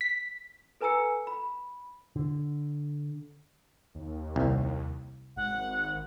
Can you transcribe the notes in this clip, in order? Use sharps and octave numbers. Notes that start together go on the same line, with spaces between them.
B6
A4 B4 G#5 A#5 E6 C#7
B5
D3
D#2
C2
G#1 F#5